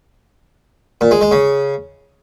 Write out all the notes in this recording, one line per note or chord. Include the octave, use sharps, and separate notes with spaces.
A#2
G#3
G#3
C#3